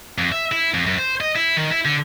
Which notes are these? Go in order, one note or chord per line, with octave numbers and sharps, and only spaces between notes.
F2
E5
E4
F2
F#2
C5
D#5
E4
D#3
E4
D3